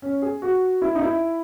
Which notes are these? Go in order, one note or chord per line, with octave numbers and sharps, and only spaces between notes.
C#4
G#4
F#4
E4
D#4
E4